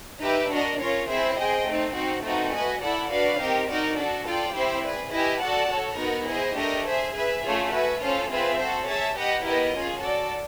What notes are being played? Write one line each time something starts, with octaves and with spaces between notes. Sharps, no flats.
D#4 G4 B4 E5
D4 F#4 A#4 D#5
C#4 F4 A#4 C#5
C4 E4 G#4 C5 E5
G#4 C5 D#5 G5
A3 C4 D#4
C4 D#4 F#4
A3 C4 D#4 F#4 B4
F#4 B4 D#5 G#5
E4 A4 D5 F#5
D4 F#4 B4 D5 F5
C4 D#4 G4 A#4
D#4 F#4 A#4 D5
D4 F#4 A4
F4 A4 D5 G5
C4 E4 G4 C5
G#4 B4 D5
E4 G4 B4 D#5 G#5
F#4 A4 D5 F#5 A5
F#4 A4 C#5
B3 D#4 F#4 A#4
E4 G#4 C5 D#5
A3 D4 G4 A#4 D#5
G#4 C5 E5
G#4 B4 E5
A3 C#4 F4 G#4
F#4 B4 E5 G#5
C#4 F4 A4 C5 F5
C4 F4 G#4 B4 E5
F#4 A4 C5
G#4 C#5 E5 A5
G4 B4 D#5 F#5
B3 E4 G4 A#4 D#5
C#4 F4 G#4
F#4 A4 D5